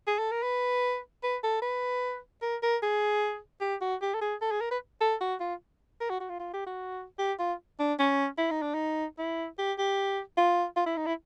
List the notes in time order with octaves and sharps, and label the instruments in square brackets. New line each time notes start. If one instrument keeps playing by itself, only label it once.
[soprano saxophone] G#4
A4
A#4
B4
B4
A4
B4
A#4
A#4
G#4
G4
F#4
G4
A4
G#4
A4
G#4
A#4
B4
A4
F#4
F4
A#4
F#4
F#4
F4
F4
G4
F#4
G4
F4
D4
C#4
E4
D#4
D4
D#4
E4
G4
G4
F4
F4
E4
D#4
E4